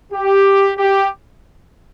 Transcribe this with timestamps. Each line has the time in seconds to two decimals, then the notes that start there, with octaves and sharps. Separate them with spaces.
0.13 G4
0.78 G4